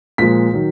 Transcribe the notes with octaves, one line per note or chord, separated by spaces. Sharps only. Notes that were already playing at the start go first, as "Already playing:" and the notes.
A#2 F3 G#3 B6
D#3 F#3